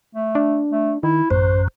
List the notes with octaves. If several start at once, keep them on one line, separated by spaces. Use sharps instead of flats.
A3
D4
A3
D#3 E4
A1 F#2 C5